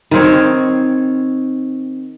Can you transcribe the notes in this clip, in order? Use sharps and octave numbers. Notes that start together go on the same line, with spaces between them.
D#3 C4 C#5